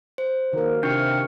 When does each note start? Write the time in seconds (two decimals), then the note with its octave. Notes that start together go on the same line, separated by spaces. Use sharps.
0.18 C5
0.53 D#3 F#3 A#3 A#4
0.83 C3 D4 F4 G4 C#5 F5 G5